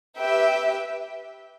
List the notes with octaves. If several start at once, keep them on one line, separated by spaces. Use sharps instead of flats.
G4 B4 E5 G5